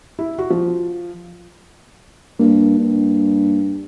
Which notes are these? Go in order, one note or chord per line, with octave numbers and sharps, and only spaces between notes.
E4
F#4
F3
G2 A#3
G2